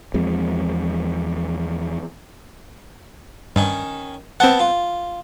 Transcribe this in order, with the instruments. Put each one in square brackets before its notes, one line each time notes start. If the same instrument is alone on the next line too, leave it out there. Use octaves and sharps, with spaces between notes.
[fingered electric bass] E2 F3 G#3 C4
[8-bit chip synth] G2 [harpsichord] D#3 C#4
[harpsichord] B3 A5 [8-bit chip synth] C4 F#5
[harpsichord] F4